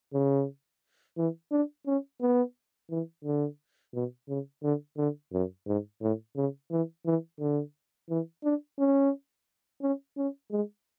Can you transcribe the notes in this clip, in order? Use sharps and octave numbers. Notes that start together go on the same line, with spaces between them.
C#3
E3
D4
C#4
B3
E3
D3
B2
C#3
D3
D3
F#2
G#2
A2
C#3
E3
E3
D3
E3
D4
C#4
C#4
C#4
G#3